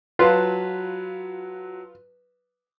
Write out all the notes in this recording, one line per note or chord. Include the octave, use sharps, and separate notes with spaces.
F#3 F4 B4 A5